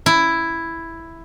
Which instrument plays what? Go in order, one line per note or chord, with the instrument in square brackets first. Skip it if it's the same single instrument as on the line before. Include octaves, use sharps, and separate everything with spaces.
[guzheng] E4